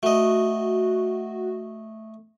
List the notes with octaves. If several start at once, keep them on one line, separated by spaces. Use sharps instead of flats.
A3 F#4 D#5